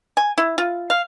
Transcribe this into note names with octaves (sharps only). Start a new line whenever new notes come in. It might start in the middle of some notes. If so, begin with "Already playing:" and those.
G#5
E4
F4
F5